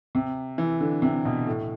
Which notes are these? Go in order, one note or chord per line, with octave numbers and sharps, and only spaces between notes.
C3
E3
D3
C3
B2
A2